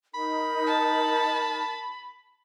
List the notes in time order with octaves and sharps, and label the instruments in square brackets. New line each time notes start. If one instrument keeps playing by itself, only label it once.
[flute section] D#4 A#4 [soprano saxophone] B5
[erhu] A5